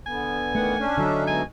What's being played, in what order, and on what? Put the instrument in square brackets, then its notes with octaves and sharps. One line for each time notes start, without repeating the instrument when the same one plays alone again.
[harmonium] D3 B3 [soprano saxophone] G#5
[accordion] D#3 E3 F#5 [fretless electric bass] A3
[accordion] C#4 D4
[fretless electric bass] D3 F#3 [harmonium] D#4 A4 E5
[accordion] B2 G#3 [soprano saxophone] G#5